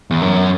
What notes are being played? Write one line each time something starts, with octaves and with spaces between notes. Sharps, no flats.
E2
F#2